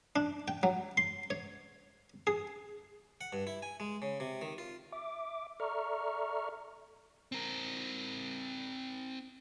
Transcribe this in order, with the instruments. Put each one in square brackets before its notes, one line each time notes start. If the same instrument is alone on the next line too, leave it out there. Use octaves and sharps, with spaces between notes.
[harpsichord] D4
G5
F#3
C6
C#5
G#4
F#5
G2
E4
G#5
G#3
C#3
C3
D#3
F4
[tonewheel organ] E5 D6
A4 D5 E5 A#5 C#6 F6
[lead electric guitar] C4 A#4